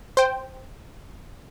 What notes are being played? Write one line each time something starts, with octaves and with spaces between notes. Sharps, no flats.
C5 G5